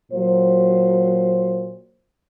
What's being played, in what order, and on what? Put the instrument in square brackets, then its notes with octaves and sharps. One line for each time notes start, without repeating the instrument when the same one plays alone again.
[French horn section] A#2 F#3 C5